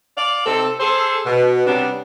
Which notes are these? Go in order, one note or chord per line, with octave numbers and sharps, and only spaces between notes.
D5 F5
C3 C4 D#4 A4
G#4 A4 C5
B2
C3 G3 B3 C#4 D4